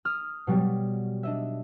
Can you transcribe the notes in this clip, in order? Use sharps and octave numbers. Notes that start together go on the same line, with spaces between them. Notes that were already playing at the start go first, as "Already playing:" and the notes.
D#6 F6
B2 F#3 G3
D4 D#5 E5